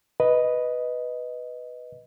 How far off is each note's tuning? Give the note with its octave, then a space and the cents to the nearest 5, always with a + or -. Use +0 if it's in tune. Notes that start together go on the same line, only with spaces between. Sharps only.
B4 +0 D#5 +0